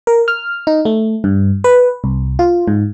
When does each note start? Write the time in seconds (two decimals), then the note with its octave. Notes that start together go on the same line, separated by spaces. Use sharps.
0.07 A#4
0.28 F6
0.67 D#4
0.85 A3
1.24 G2
1.64 B4
2.04 C2
2.39 F4
2.68 G#2